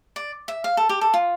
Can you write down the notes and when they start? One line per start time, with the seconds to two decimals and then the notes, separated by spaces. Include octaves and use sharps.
0.16 D5
0.48 E5
0.64 F5
0.77 A4
0.89 G4
1.01 A4
1.14 F4